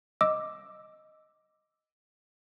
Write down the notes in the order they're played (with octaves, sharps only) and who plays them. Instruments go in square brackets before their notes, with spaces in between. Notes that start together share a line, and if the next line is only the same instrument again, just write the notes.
[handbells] D#5 D6 E6